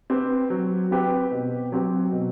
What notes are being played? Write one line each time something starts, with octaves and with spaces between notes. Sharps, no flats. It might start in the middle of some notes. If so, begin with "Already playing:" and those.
C4 G4 B4
F#3
C4 G4 B4
B2
F#3 C4 G4
B2